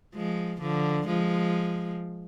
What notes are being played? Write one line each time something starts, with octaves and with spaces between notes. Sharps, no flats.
F3 G#3
D3 F3
F3 G#3